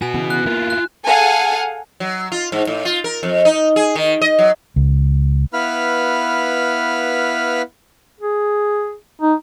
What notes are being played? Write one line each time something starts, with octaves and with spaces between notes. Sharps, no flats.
F#4 B4 G#5
C#3 E3 B3
F#6
A#3 E4 F4
F#6
G#4 A4 F5 F#5 G#5
F#3
F4
G#2
A2
F4
A#4
F2
D#4
G#4
D#3
D#5
F#3
C#2
B3 E4 B4 F5 B5 F6
G#4
D#4